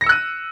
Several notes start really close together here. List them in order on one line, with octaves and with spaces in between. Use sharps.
A#6 C#7 E6 F#6 D#7